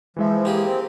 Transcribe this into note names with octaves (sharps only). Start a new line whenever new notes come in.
E3 F3 G#3 E5
A#3 G4 G#4
C4